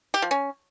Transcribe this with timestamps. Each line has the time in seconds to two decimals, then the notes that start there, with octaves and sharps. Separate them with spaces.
0.14 G4
0.22 F3
0.31 C#4